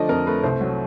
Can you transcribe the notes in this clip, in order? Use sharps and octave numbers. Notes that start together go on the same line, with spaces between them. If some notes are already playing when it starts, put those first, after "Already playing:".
Already playing: D3 F3 A3 D5 D#5
F2 A#4
A3 B4
C2 C5
F#3